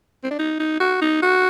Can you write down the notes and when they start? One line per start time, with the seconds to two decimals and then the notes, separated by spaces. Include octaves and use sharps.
0.23 C4
0.30 D4
0.39 D#4
0.59 D#4
0.80 F#4
1.02 D#4
1.22 F#4